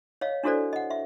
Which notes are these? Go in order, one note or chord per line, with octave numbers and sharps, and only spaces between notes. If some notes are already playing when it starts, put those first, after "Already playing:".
C#5 D#5 F5
D4 E4 F#4 A4 C5 D5
D#5 F#5
E5